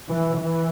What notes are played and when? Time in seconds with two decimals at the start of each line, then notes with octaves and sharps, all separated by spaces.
0.10 E3
0.40 E3